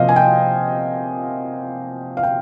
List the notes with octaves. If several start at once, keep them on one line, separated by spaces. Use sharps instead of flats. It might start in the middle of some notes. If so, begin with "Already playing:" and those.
Already playing: C3 F3 A#3 C5 D#5 F5
G#5
G5
F5
G5